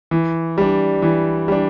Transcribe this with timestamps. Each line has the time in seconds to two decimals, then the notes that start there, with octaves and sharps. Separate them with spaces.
0.11 E3
0.58 G3 D4
1.02 E3
1.48 G3 D4